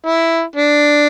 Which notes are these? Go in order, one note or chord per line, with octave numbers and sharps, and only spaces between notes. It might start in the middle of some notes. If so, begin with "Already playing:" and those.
E4
D4